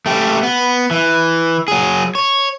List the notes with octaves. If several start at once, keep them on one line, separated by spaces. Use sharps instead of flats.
A3 G4
B3
E3
F#3 G#4
C#5